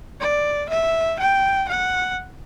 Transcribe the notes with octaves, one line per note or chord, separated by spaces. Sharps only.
D5
E5
G5
F#5